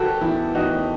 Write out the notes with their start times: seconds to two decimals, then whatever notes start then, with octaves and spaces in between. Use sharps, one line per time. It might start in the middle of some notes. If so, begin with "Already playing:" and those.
Already playing: D#3 F#3 F#4 G4 A4 B4
0.21 E2 E4
0.55 E2 D#4 F#4